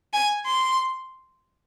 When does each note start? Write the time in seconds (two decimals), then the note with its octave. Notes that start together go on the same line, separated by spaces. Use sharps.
0.14 G#5
0.46 C6